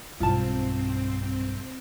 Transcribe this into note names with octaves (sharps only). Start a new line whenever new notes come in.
B1 G2 C4 F4 A5